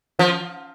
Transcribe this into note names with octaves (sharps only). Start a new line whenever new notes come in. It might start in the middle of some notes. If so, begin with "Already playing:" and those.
F3